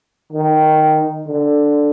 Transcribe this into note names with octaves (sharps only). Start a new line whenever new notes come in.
D#3
D3